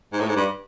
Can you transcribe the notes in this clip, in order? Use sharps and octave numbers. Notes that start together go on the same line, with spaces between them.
G#2
A2
G#2
G2